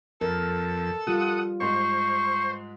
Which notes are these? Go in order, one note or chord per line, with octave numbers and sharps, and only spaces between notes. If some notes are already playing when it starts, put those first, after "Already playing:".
F2 A4 A#4
G3 F4 G4 F#5 D#6
G#2 G#3 C5 C#6